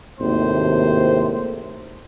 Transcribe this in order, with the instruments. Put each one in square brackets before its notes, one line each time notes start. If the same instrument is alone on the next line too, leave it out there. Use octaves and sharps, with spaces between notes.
[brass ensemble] G#1 D#2 A2 C3 C5